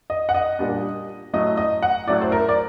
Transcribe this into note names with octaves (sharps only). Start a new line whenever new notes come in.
D#5
F#5
D#5
A#2 G3 D4
A2 F#3 A3 D#5
D#5
F#5
A2 F#3 A3 D5
C5
A#4
D5